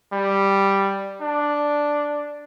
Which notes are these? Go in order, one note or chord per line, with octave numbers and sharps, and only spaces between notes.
G3
D4